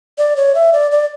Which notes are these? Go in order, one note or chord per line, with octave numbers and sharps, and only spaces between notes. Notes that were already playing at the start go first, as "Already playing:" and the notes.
D5
C#5
E5
D5
D5